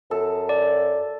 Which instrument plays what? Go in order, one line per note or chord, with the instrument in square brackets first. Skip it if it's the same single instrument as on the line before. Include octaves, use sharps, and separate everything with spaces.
[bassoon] F#2 [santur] A4
[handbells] D5